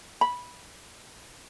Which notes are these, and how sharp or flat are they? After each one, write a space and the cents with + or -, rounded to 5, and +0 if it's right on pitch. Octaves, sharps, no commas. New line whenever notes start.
B5 -10